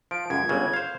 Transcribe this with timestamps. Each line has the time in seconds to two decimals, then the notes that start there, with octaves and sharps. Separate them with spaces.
0.11 F3 D7
0.30 C#2 F#2 G#6
0.49 G1 C#3
0.73 C5 F5